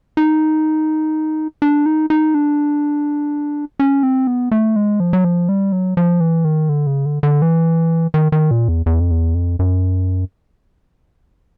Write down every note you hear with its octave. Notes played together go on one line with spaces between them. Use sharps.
D#4
D4
D#4
D#4
D4
C#4
C4
B3
A3
G#3
F3
F#3
F3
G3
F#3
F3
E3
D#3
D3
C#3
D3
D3
E3
D#3
D#3
A#2
E2
E2
F2
E2
F2
F#2